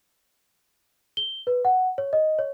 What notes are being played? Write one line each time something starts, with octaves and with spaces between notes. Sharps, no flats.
G7
B4
F#5
C#5
D#5
C#5